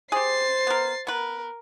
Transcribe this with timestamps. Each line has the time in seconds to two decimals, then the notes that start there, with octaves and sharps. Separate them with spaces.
0.12 G4 G#4 C5 A6 C7
0.67 B3 A#4
1.07 B3 A#4 B4